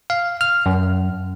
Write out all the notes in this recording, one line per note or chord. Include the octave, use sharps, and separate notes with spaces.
F5
F6
F#2